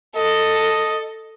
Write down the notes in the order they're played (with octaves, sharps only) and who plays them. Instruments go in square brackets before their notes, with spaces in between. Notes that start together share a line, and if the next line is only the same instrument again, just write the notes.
[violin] A4 [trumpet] D#5